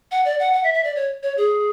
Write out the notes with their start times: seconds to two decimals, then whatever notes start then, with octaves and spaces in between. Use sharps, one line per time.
0.11 F#5
0.25 D5
0.39 F#5
0.53 F#5
0.64 E5
0.74 E5
0.84 D5
0.96 C#5
1.23 C#5
1.37 G#4